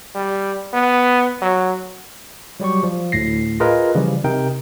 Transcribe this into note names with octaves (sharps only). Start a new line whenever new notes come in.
G3
B3
F#3
F#3 G3 G4 C#6
F3
D2 A2 A#6 C7
F4 G#4 A#4 B4 D#5
C#3 E3 F3 G3
C3 D#4 A#4 G5